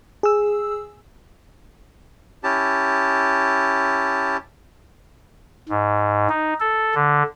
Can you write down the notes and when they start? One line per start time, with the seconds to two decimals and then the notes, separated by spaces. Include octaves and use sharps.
0.23 G#4 E6
2.44 C#4 E4 G4 A5
5.69 G#2
6.29 D#4
6.60 A4
6.95 D3